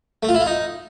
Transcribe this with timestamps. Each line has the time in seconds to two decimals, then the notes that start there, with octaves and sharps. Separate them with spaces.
0.23 A3
0.29 F4
0.34 E4
0.40 F4
0.46 D#4